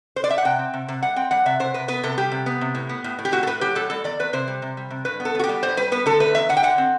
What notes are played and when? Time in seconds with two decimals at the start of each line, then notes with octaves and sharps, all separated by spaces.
0.16 C5
0.24 D5
0.30 E5
0.38 F#5
0.45 C3 G5
0.59 C4
0.74 C3
0.88 C3
1.02 G3 F#5
1.16 C4 G5
1.31 G3 F#5
1.46 C3 E5
1.60 C3 C5
1.74 C3 B4
1.88 B3 B4
2.03 C3 A4
2.18 G3 G4
2.32 C3
2.46 B3
2.61 C3
2.75 A2
2.89 B3
3.04 A2
3.19 A2
3.25 G4
3.32 A2 F#4
3.43 A4
3.47 A2 B4
3.61 F#3 G4
3.75 A2 A4
3.90 G3 A4
4.04 E2 D5
4.19 E2 B4
4.33 C3 C5
4.47 G3
4.62 C3
4.77 G3
4.90 C3
5.05 G2 B4
5.20 B3
5.25 A4
5.35 B3 F#4
5.44 G4
5.49 G3
5.63 G2 C5
5.77 G3 B4
5.92 B3 B4
6.06 D3 A4
6.20 A3 B4
6.35 E2 E5
6.49 D3 F#5
6.57 G5
6.63 D3 F#5
6.78 C4